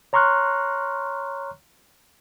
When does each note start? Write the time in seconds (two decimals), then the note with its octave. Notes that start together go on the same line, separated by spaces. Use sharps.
0.13 C#5 A#5 C6 C#6 F6 F#6